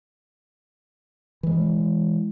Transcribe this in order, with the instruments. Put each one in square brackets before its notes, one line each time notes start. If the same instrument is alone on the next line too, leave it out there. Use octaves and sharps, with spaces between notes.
[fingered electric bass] E3 G#3